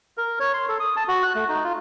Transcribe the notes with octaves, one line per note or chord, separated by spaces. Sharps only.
A#4
C#5
C6
A4
D#6
A5
F#4
F#6
A3
D#4
F4